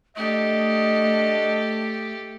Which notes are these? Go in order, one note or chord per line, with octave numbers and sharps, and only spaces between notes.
A3 D4 G4 A4 D#5